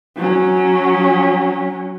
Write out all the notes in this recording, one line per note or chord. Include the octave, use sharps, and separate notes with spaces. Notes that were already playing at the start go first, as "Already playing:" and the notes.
F#3 C#4